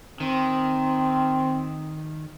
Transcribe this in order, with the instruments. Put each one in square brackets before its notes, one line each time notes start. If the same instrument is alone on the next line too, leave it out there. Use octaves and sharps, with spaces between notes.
[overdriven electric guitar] D#3 [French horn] C4